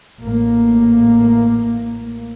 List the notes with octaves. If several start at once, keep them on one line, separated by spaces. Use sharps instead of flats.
A1 A#3